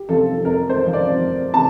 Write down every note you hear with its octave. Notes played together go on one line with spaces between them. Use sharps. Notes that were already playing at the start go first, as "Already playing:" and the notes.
Already playing: G4
C3 F3 A4
F2 A#4
C5
C3 F3
D5
F2
C3 A5